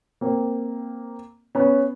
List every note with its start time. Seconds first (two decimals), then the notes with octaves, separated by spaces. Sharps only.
0.21 A#3 C4
1.55 B3 C#4